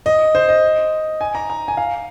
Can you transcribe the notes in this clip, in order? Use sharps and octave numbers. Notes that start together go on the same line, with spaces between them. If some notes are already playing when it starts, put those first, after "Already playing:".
D#5
C5
D#5
G#5
A#5
A#5
G#5
F5